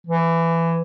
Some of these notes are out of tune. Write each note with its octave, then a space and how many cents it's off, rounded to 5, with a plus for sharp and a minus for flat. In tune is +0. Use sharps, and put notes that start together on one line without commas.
E3 +15